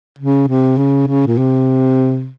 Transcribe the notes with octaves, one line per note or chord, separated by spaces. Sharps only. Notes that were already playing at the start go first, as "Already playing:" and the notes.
C#3
C3
C#3
C#3
A#2
C3